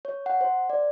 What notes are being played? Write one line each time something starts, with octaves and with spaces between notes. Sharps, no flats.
C#5
F#5
C5
D5